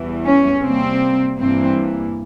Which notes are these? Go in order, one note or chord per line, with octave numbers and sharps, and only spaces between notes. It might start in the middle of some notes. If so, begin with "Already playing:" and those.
Already playing: E2 E3 G3
C#4
C3 G3 A#3 C4
G2 E3 A#3 C4